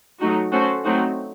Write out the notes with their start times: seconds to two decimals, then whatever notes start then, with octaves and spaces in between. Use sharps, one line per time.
0.20 F#3 A3 D#4 F#4
0.51 A3 C#4 F#4 A4 C5
0.83 F#3 A3 C4 D#4 F#4